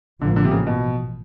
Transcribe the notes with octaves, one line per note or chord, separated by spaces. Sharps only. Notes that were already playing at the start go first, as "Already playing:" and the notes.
A1 G#2 D3 F3 A#3
D3
C3
C#3
B2